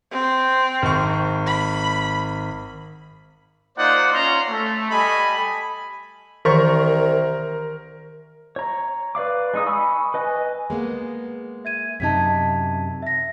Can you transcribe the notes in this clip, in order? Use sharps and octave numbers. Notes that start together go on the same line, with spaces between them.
C4
G#1 C#6
B5
A#3 D#4 F4 C5 D5 F#5
C#4 F4 C#5 A#5 C6
A3
G3 A4 D#5 G#5 B5
C2 D#3 E3 A#4 C5 C#6
C#5 A#5
B4 D5 F5 D6
G#3 D#4 D#6
G#5 B5 C#6 D#6 E6
B4 D#5 G#5
G#3 A#3 B3
E5 G#6 D#7
F#2 C3 D#4 A5 G#6 B6
E5 A#6